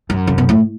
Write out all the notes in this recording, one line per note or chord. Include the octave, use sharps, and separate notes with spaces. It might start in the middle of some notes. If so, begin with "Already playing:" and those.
F#2
C#3
B2
A2